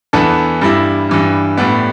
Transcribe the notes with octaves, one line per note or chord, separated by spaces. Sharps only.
E2 E3 B3 D4 A4
G2 G3 E4
G2 E3 G3
A2 G3 B3 D4